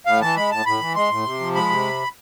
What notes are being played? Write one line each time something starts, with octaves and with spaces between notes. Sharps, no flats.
A2 F5
E3 A5
G#3 B5
A2 A5
A2 B5
E3
G#3 C6
A2
C3
F3
G#3 B5
C3